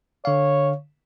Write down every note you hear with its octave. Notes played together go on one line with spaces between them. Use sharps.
D3 C#5 F5